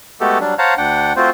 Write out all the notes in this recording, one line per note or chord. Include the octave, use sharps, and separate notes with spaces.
G#3 A3 B3 F#4 G4 A4
F#3 G3 D4
C5 C#5 F5 F#5 A5 A#5
D2 D4 F#5 G5
A3 C4 F4 F#4 C5